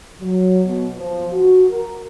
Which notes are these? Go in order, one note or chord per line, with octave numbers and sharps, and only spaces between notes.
F#3
B2
F3
F#4
A#4